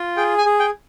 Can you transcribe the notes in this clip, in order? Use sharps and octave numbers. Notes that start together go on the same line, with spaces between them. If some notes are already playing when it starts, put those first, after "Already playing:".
Already playing: F4
G#4 G5
G#5
G#4
G5